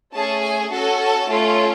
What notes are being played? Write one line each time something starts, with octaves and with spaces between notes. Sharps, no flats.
A3 C#4 G#4 A5
G#5
C#4 F#4 A4 A5
A5
A3 C#4 F4